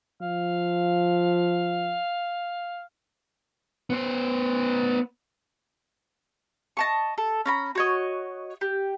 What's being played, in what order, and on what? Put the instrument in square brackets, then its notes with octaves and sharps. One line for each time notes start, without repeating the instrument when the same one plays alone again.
[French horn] F3 [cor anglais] F5
[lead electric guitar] B3 C5
[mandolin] D#5 A5 C#6
A4
C#4 A#5 B5
F#4 C#5 D#5
G4